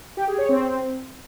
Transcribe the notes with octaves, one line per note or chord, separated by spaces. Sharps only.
G4
G#4
C#5
C4